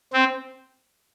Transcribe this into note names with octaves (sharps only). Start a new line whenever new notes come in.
C4